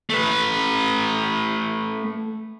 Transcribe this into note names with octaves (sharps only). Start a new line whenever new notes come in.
A3 B4